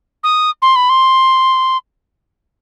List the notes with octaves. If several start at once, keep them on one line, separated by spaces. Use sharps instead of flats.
D#6
C6
B5
C6